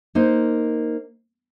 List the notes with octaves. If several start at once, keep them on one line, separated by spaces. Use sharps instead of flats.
A#3 D#4 C5